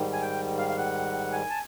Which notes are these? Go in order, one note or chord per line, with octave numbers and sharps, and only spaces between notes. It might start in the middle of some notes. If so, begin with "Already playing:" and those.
Already playing: G#2 D#3 G3
G#5
G5
F5
F5
F#5
G#5
A5